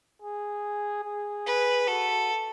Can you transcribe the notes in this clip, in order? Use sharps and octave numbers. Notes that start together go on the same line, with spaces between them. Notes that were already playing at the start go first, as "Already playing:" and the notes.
G#4
G#4
B4
F#4 A4